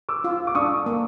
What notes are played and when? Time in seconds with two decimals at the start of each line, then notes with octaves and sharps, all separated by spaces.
0.09 D6 E6
0.24 F4
0.47 D6
0.55 D4 C#6 D#6
0.86 A#3